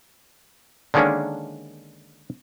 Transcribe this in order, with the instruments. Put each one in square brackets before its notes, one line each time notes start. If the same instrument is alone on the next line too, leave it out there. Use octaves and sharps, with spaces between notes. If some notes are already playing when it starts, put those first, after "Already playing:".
[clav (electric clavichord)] D3 D#3 G#3 A#3 C#4 D4